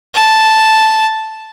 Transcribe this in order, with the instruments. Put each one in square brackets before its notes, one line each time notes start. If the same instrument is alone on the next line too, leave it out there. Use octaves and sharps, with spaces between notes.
[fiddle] A5